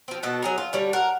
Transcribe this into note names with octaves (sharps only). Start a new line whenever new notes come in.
F3 C4
B2 A4 F#5
F#3 G#4 A#4
F4
D3 G3 C#5
A#4 F#5